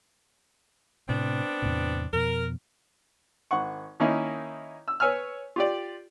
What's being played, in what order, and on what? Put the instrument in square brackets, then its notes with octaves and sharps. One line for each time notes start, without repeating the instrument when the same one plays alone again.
[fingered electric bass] A2 C3 [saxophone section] B3 C4 D4
[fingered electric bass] E2 A2 C3
[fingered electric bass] F2 B2 [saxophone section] A#4
[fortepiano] G#1 F#5 C#6
D#3 A#3 C#4 D#4 E4
E6
B4 C#5 G#5 E6 F6
F4 G4 D5